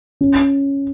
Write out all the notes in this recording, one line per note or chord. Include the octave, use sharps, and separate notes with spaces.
C#4